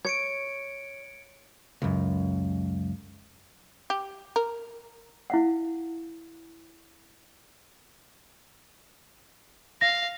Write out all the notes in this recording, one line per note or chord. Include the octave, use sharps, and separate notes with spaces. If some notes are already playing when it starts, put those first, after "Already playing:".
C#5 G#6 C#7 D7
C#2 F#2
G4
A#4
E4 F5 F#5
F5 A#6